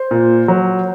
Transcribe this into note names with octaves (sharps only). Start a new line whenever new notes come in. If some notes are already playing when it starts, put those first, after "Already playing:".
Already playing: C5
A#2
F#3